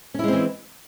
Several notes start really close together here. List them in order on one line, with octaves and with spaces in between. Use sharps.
C#4 E4 G#3 C4 E3